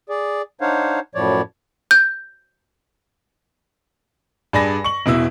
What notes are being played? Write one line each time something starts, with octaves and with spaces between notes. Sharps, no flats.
G#4 D5
D4 D#4 C5 C#5 F5 F#5
F#2 A2 F3 C#5 D5
G6
G2 G#4 D5 G#5 B5 A#6
C#6 F#7
E1 B2 E4 E6